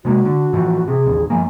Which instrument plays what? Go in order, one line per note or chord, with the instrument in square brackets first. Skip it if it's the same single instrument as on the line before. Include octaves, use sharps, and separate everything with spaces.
[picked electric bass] C3 G#3 A#3 [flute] F#4
[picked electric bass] D3
A2 E3 F3
[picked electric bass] C3 [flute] G#4
[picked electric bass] A1 D#2
[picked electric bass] F#2 F3 A#3 [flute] G#5